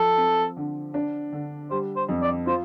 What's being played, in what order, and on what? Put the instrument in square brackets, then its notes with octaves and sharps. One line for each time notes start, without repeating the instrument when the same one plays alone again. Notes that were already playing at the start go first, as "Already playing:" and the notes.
Already playing: [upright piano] F3 [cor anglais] A4
[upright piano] C4
D3
D4
D3
[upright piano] G3 [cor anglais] C5
[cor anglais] C5
[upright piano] F2
[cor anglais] D5
[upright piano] F4 [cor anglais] C5